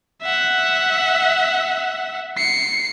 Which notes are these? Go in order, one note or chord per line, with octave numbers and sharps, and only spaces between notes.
E5 F#5
C7 C#7